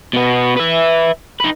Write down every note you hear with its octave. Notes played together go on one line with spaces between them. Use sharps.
B2 B3
B4 E5
D#4 B4